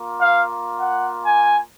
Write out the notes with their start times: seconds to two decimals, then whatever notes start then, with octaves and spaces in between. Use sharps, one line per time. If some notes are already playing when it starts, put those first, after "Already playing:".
Already playing: A#3 F4
0.20 F5
0.79 F#5
1.23 G#5